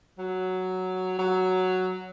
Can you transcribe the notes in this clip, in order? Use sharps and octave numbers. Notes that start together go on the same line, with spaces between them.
F#3
F#3